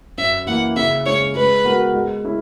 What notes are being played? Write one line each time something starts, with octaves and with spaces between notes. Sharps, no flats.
F#2 E5
E3 A#3 E4 F#5
C#3 E5
G#3 C#4 C#5
G#3 B4
B3 F#4 A#4
G#3
C#4 E4